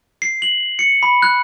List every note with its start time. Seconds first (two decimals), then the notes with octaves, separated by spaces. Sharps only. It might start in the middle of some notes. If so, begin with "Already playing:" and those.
0.22 C7
0.42 F#7
0.79 C#7
1.03 B5
1.22 F#6